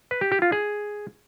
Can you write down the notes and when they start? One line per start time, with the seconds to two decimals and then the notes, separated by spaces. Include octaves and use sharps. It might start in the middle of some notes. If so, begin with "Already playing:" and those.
0.11 B4
0.21 G4
0.32 G4
0.42 F4
0.52 G#4